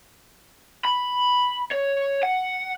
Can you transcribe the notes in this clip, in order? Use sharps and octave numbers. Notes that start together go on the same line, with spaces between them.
B5
C#5
F#5